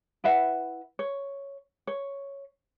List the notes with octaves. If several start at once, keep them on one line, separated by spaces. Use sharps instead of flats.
E4 B4 E5 F#5
C#5
C#5